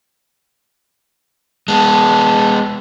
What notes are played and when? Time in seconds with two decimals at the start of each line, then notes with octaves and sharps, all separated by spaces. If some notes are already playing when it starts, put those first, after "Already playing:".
1.68 G#3 B3 A5